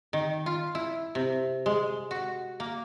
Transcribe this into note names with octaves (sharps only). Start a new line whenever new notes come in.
D#3
F4
E4
C3
G#3
F#4
A#3